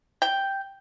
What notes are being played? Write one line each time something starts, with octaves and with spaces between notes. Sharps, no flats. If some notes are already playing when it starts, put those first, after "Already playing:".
G5